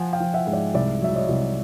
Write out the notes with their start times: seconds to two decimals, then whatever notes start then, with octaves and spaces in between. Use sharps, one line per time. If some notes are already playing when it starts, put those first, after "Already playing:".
Already playing: F3 F#5 G#5
0.13 F5 G5
0.20 F3
0.34 E5 F#5
0.47 G#2
0.53 D5 E5
0.74 C2 D5 E5
1.01 F#3 E5
1.15 C#5 D#5
1.29 C2